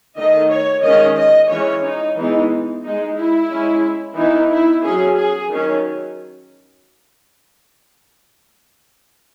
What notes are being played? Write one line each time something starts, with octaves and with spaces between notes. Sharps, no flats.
D#3 A3 D#4 D#5
C#5
D#3 G#3 C#4 D#5
D#5
E3 G#3 C#4 C#5
D#4
E3 G#3 B3 D#4
G#3 D#4
E4
G#3 C#4
E3 B3 D#4 E4
E4
F#3 C#4 G#4
G#4
D#3 F#3 C#4